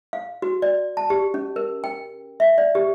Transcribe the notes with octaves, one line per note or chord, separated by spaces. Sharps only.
F5
F#4
D5
A5
G4
C#4
A#4
G5
E5
D5
G4